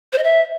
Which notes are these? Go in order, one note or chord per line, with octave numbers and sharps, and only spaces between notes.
C5
D#5
E5